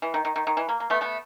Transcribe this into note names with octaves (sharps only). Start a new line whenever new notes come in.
E3
D#3
D#3
D#3
D#3
E3
A#3
A#3
A3 B3
A3 B3